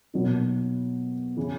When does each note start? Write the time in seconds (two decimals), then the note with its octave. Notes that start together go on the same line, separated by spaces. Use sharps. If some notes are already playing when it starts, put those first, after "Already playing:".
0.14 B2 F#3 A#3 D#4
1.37 C#3 E3